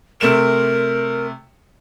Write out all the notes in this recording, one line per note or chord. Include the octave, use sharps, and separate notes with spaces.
C3 A3 A#4 E7